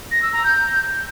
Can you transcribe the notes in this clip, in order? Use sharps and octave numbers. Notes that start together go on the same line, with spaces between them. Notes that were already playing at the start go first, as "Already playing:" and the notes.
A#6
E6
A#5
G6